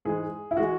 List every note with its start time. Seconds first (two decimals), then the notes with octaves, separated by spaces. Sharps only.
0.05 G#2 E3 G#3 G#4
0.51 E4
0.57 E3 G#3 F#4